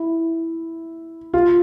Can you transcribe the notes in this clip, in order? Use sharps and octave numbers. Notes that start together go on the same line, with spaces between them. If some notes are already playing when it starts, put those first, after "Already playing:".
Already playing: E4
F4